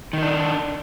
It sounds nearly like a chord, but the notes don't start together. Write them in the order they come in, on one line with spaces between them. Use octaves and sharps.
D#3 D#4 D4